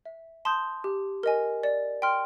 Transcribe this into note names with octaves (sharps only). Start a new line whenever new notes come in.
E5
A5 C6 D#6 G6
G4
A#4 D#5 G#5
D5
G5 C6 F6